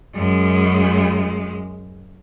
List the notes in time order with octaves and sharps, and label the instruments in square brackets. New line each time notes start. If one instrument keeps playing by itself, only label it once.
[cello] F#2 G#3